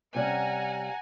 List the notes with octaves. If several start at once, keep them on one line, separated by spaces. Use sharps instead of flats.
C3 G3 C#4 F#5 G#5 A#5